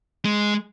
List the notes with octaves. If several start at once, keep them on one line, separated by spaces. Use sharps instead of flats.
G#3